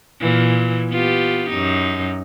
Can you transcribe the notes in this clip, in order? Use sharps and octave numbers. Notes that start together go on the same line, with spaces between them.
A#2 E3
B3 F4 G4
F#2 D#4